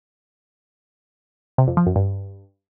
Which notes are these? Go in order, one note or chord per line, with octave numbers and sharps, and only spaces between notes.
C3
F2
F3
F#2
G2